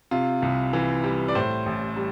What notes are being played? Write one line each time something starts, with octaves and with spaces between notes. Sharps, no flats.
C3 F4
C2
E3
G3
D5
A2 C5
A1
G3